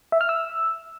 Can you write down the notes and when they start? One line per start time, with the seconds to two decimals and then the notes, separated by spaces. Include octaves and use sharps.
0.12 E5
0.21 F6
0.29 E6